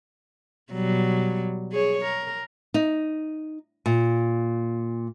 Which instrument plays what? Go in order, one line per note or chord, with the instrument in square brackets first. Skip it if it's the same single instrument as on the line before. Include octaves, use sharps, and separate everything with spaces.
[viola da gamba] B2 F#3 G3
G#4 C#5
A#4
[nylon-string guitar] D#4
A#2